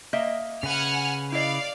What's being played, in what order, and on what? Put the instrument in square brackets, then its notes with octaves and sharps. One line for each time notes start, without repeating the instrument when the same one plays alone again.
[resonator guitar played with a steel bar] A#3 D#5 E5
[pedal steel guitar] C#3 B4 [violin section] F#5 G#5 F6
[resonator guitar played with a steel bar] E4 D#5 [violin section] D5 F5